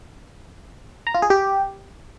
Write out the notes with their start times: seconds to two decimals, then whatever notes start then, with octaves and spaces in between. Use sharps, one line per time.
1.07 A#5
1.14 F4
1.22 G#4
1.30 G4